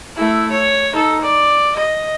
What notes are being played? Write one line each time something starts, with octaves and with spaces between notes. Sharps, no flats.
A3 E4
C#5
D#4 A4
D5
D#5